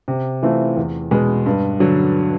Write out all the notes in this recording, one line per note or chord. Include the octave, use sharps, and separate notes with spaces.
C3
E3 A3 C4 F4
E2
B2 G#3 B3
G2
D3 F#3